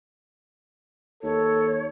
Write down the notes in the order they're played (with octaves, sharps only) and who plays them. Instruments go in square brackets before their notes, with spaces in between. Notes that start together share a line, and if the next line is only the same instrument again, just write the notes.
[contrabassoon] D#2 [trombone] A4 [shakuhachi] C#5